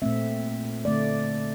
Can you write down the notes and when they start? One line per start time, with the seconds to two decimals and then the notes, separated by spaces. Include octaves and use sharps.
0.02 A#2 A3 C4 E5
0.85 D3 A3 C4 D5